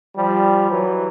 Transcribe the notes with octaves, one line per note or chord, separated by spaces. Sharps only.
F3 G3
E3 F#3